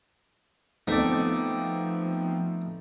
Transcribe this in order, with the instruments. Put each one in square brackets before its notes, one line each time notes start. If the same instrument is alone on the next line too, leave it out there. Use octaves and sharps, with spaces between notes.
[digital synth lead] F3 [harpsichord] A3 D5 [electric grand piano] B3 C4 D#4